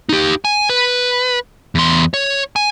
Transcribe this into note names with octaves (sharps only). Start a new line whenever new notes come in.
D#4 G4
G#5
B4
E2 C6
C#5
G#5